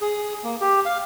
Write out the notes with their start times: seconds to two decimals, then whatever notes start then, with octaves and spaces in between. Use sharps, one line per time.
0.01 G#4
0.44 A#3
0.61 G4
0.85 F5